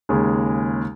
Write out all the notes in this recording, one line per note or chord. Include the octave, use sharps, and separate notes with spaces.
D#2 C#3 G#3